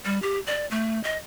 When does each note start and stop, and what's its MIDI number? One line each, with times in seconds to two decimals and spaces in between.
0.05 0.19 55
0.22 0.40 67
0.47 0.66 74
0.71 1.02 57
1.04 1.17 75